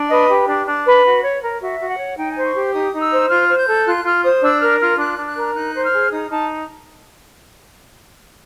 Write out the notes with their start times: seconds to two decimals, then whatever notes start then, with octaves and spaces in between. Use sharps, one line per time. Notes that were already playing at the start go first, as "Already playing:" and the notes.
Already playing: D4
0.09 B4 D#5
0.28 G4
0.47 D4
0.66 D4
0.85 B4
1.03 F#4
1.23 C#5
1.41 A#4
1.60 F#4 E5
1.79 F#4
1.88 F#5
1.98 C#5
2.17 D#4 G5
2.31 C5 G#5
2.44 C#6
2.54 G4
2.73 D#4 D#6
2.92 D#4
3.01 E6
3.11 C5
3.29 F4 F6
3.48 C5
3.58 G6
3.67 A4
3.86 F4 F#6
4.04 F4 F6
4.23 C5 D#6
4.42 D4 E6
4.61 A#4 F6
4.80 F4 F6
4.98 D4 F#6
5.17 D4
5.27 F#6
5.36 A#4
5.55 D#4 F#6
5.74 C5
5.84 F6
5.93 G#4
6.11 D#4 D#6
6.30 D#4 A5